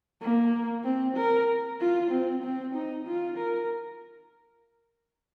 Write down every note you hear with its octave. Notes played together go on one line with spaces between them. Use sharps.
A#3
C4
A#4
F4
C4
C4
D#4
F4
A#4